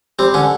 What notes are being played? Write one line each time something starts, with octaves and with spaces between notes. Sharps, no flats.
G3 C4
D3 C#4